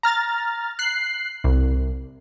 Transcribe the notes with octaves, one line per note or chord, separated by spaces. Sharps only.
A#5 F6 A6
F#6 C7
C2